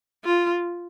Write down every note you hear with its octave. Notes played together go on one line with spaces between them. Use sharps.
F4